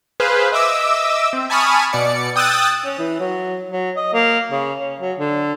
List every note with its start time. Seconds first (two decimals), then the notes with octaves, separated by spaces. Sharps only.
0.20 G#4 B4 C5 F5
0.52 D#5 E5 D6 E6
1.33 C4
1.50 G#5 A5 B5 C#6 D#6 F6
1.93 B2 D5 C#7
2.36 G5 D#6 E6 F#6 A6
2.85 C#4
2.99 E3
3.20 F#3
3.71 F#3
3.97 D#5
4.13 A#3
4.52 C#3
4.79 C#4
5.00 F#3
5.18 D3